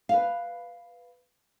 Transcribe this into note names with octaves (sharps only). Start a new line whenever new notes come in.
B4 F5